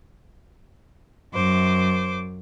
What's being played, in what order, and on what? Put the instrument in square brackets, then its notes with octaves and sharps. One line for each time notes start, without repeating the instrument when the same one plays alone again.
[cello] F#2 [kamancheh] C5 D6